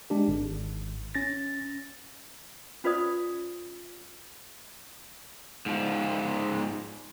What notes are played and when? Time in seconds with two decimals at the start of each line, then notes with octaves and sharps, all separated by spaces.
0.10 G#3 D4 G4
0.28 G#1
1.15 C#4 A6 A#6
2.84 C#4 F4 B4 C5 D5 D#6
5.66 G#2 F3